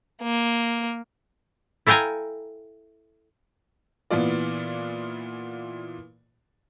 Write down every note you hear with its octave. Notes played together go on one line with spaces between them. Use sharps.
A#3
E4 A4 F5 G5 G#5 A#5
A#2 E3 B3 F4 D5